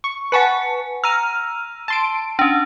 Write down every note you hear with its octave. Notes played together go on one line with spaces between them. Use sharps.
C#6
B4 F#5 G#5 A5 C#6 C#7
A#5 E6 F6 D#7
A5 C6 D7
C#4 D4